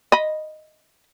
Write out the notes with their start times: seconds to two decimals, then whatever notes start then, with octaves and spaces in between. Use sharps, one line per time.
0.12 D#5 B5